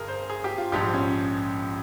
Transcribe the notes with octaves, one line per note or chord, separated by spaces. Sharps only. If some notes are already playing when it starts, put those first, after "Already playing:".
Already playing: G1 G2 G#4 A#4
C5
G#4
G4
F4
A#1 G#2 F3 G4
C#4